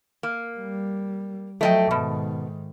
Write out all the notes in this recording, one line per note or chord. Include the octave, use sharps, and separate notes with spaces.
A#3
G3
F3 F#3 A3 D#5 G5
G#2 B2 D#3